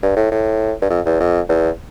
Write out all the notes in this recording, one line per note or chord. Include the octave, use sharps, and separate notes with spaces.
G2
A2
A2
G2
F2
E2
F2
E2